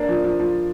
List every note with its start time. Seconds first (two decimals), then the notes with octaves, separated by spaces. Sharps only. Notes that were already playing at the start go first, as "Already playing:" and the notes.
Already playing: A#3 D4
0.09 F3
0.24 F3
0.39 F3